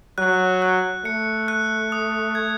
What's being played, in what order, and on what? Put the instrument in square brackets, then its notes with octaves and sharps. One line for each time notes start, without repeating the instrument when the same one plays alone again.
[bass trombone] F#3 [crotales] F#6
[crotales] F#6
[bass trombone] A3 [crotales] C#7
[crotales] F#6
D#6
G#6